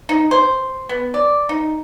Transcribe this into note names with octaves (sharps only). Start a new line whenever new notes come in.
D#4
C5
B3
D5
D#4